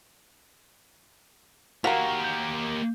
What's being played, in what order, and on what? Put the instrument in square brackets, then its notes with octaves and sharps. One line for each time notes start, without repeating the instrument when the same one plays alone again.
[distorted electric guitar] A#3 G4 [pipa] F#4 A#4 [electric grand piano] F5 C#6 B6
[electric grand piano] G6